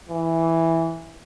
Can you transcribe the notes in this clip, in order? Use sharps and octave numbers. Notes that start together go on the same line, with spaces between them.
E3